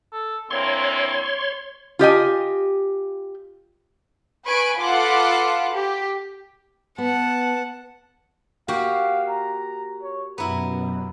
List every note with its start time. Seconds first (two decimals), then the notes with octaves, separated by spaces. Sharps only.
0.13 A4
0.51 E3 A#3 C4 D4 C#5 C6
1.99 F4 G4 D#5 G#5
4.45 B4 G#5 C#6 D7
4.78 F4 A4 B4 F#5 C6 D6
5.74 G4
6.98 B3 F#5 A5
8.68 A#3 F#4 G4 F5
9.29 A#5
10.03 C#5
10.38 F#2 B2 B3 E4 A#5